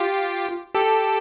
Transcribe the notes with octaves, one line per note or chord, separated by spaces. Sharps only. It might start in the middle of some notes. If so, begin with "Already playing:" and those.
Already playing: F4 G4
G4 A4